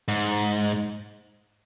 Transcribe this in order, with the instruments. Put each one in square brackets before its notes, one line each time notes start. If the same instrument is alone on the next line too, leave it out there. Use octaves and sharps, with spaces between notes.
[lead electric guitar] G#2